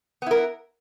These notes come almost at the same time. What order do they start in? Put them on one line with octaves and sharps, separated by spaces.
B3 E4 A#4